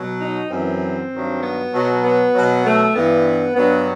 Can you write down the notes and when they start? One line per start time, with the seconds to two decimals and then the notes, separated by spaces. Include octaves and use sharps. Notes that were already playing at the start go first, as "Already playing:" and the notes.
Already playing: B2 F#3
0.20 D#4
0.50 F#2 E3 C4
1.12 G2 D#3 F#3
1.42 B3
1.73 B2 F#3
2.04 B3
2.34 B2 F#3
2.65 A3
2.95 G2 E3 B3
3.56 G2 F#3 B3